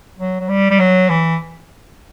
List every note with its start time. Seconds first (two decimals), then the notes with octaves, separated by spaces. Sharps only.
0.18 F#3
0.40 F#3
0.49 G3
0.71 G3
0.79 F#3
1.09 E3